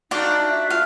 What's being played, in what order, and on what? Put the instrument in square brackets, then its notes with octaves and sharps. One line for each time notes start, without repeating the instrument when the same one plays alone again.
[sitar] A3 D4 F#4 [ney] D#4 [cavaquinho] F4 D5
[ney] E5
[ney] F4 [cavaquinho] F5